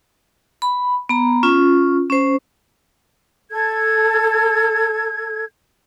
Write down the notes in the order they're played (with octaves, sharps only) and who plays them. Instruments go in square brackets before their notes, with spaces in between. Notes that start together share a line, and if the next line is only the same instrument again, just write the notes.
[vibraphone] B5
B3 A#5
C#4 F4
C#4 C5
[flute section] A4 G#6